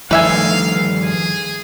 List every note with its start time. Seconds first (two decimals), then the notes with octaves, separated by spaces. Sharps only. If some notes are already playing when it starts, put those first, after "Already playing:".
0.11 G2 D#3 F3 A3 B4 E5 F5 G#5
1.03 G#4